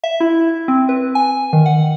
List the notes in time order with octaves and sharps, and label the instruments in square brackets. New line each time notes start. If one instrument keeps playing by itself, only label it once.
[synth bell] E5
E4
C4
B4
G#5
D#3
F#5